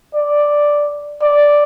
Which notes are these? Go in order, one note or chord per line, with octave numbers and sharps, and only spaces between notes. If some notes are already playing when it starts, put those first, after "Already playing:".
D5
D5